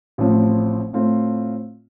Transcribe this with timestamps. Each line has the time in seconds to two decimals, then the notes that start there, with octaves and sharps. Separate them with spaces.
0.18 A1 A2 F3 C4
0.93 A2 A3 C4 F4